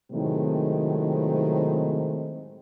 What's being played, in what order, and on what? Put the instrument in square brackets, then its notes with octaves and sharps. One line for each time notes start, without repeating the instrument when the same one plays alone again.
[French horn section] A2 C3 D#3 F#3 G#3 C4